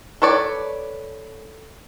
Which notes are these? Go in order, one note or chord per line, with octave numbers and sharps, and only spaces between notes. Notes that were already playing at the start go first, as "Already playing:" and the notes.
A4 B4 C#5 D5